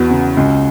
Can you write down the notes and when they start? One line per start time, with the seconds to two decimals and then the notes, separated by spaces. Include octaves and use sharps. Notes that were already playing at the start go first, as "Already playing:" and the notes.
Already playing: E2 B3 F#4
0.11 C#3
0.37 C#2